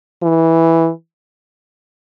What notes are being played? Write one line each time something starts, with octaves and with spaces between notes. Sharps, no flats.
E3